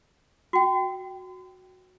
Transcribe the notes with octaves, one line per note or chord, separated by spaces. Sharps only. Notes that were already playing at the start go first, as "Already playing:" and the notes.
F#4 G5